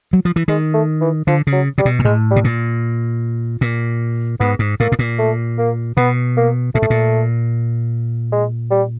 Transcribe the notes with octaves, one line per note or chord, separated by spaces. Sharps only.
F#3
F3
E3
D#3 G#3
A3
E3
D3 F3
C#3
F#3
C3 G3
B2
A#2
A2 G#3
G3
B2
A#2
A#2
G#2 B3
G#2
A2 A#3
A2
A#2
A3
A#3
B2 B3
A#3
A#2 A3
A2
A#2
G#3
G3